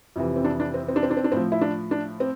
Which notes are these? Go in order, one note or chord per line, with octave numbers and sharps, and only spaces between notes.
F2 C3 E3
C4
D4
D4
C4
C4
D4
C4
D4
C4
D4
A2 F3 C4
E4
D4
D4
C4